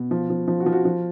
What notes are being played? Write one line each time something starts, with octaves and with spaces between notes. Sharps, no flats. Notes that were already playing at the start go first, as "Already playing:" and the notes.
Already playing: B2
F3
F3
F3
F#4
F3
F#4
F3